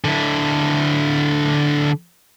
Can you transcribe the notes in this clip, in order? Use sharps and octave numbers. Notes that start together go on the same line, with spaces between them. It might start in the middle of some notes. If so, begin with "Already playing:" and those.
D3 E4